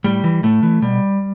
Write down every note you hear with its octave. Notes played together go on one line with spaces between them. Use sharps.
A2 G3
E3
A2 A3
E3
B2 G3